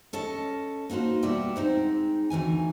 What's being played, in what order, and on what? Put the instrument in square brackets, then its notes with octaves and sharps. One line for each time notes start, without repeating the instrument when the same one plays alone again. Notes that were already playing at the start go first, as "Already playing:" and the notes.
[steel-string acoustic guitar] C#4 A4 D#5 A5
A#3 D#4 F#4 B4 C5
B2 G3 B3 D4 D5 E5
G#3 C4 D#4
D2 E3 D#4 G#5